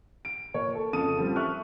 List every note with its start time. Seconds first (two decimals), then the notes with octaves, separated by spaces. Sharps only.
0.25 D7
0.54 A#2 C#5
0.75 A4
0.93 F2 C#3 A4 D#6 D#7
1.18 F3 G3 C4
1.36 E5 C#6 F6 F#6